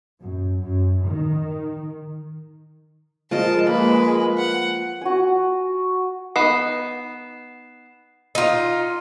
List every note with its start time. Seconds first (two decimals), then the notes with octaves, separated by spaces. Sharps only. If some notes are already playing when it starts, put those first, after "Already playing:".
0.20 F#2
0.60 F#2
1.07 D#3
3.31 F3 G#3 A#4 D#5 A5
3.67 A#3 B4
4.38 F#5
5.02 F#4 G#5
6.36 B3 D#4 C7 E7
8.35 D#4 F4